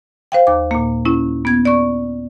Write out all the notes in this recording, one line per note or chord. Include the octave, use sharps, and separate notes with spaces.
C5 F5 G5
D#2 D6
A#2 A#3
C#4 E4
B3 G#6
D5 C#6